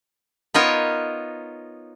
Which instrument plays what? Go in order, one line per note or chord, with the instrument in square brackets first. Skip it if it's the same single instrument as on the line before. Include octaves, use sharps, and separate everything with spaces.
[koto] B3 D#4 F4 A#4 C#5